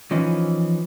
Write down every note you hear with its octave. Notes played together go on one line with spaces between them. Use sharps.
E3 F3 C#4 D#4